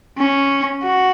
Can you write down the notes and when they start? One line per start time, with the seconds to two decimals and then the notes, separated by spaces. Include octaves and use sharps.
0.18 C#4
0.83 F#4